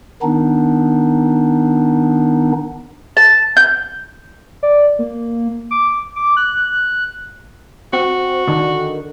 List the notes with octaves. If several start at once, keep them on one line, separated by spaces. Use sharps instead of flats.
D#3 B3 D4 D#4
A5
G6
D5
A#3
D6
D6
F#6
C4 F#4
D3 D#3